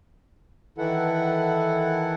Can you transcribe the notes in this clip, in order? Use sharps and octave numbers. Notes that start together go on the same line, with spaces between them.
D#3 E3 E4 A4 F#5